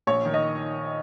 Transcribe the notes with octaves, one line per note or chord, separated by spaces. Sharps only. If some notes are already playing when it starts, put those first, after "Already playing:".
A#1 C#5
D#3
D#5